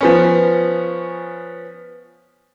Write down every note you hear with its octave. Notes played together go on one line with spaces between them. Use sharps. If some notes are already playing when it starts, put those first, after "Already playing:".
F3 B3 C#4